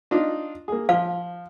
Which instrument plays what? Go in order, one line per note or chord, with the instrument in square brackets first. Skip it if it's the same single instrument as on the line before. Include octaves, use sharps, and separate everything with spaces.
[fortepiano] D4 D#4 F4
A#3 G#4
[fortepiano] F3 [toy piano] F5